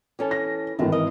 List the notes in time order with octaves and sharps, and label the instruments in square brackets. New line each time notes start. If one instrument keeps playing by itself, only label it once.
[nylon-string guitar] E3 C#4 A4
[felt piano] A#6
[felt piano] G#1 E3 [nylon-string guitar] A2 A3
[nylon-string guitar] A#4 D#5